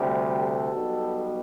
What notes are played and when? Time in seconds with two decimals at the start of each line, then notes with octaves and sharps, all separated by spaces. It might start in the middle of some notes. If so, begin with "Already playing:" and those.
Already playing: D2 C3 G3
0.08 G4
0.39 A4
0.70 B1 B2 G3 B3